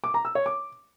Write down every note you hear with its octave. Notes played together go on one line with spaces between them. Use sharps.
D6
A#5
E6
C#5
D6